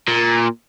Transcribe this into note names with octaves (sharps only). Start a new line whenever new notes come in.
A#2